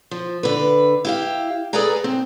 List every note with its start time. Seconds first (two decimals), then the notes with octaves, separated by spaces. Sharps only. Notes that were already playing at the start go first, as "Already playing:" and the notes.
0.11 F3
0.43 D3 B4
1.05 E4 G4 F5
1.73 G#4 A4 B4 D5 G#5 A#5
2.04 C4